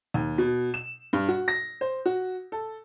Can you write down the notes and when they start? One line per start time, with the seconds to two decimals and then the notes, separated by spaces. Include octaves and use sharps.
0.14 D#2
0.38 B2
0.74 E7
1.13 G2
1.28 F#4
1.48 A#6
1.81 C5
2.06 F#4
2.52 A4